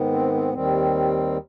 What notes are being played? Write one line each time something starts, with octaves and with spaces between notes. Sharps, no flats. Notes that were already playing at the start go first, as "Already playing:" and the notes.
Already playing: G#2 D#3 B3
C4
C4
D#2 D#3 G3 C4